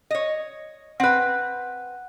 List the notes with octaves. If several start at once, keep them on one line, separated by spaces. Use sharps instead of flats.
C#5 D#5
C4 B4 F#5 F#6